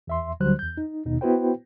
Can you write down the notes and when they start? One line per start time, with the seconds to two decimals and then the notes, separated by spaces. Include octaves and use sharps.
0.07 E2 E5 C6
0.40 D2 D3 F#3 G3 C5 F#6
0.59 E2 G6
0.77 D#4
1.05 D#2 B2 D#4
1.21 B3 E4 F#4 B4 C5 G5